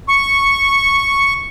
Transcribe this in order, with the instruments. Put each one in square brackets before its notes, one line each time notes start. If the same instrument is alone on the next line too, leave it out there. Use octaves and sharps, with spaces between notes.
[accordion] C#6